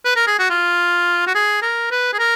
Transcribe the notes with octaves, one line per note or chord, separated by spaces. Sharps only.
B4
A#4
G#4
F#4
F4
F#4
G#4
A#4
B4
G#4
A#4